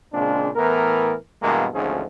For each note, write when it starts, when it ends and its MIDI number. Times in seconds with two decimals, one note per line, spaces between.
0.13 0.50 46
0.13 0.50 49
0.13 0.50 56
0.13 0.50 60
0.13 0.50 62
0.56 1.14 45
0.56 1.14 52
0.56 1.14 59
0.56 1.14 70
1.43 1.67 43
1.43 1.67 47
1.43 1.67 52
1.43 1.67 56
1.43 1.67 58
1.74 2.03 32
1.74 2.03 38
1.74 2.03 53
1.74 2.03 61
1.74 2.03 63
1.74 2.03 68